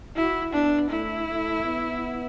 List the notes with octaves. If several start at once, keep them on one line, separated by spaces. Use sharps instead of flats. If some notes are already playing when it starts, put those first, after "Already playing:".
E4 F#4
B3 D4
A3 E4
A3
B3